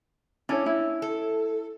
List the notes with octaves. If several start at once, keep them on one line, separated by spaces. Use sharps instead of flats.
C#4 D4 E4 C#5
E4
A4